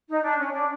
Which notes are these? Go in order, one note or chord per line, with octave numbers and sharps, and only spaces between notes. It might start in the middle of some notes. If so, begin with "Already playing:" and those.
D#4
D4
C#4
D4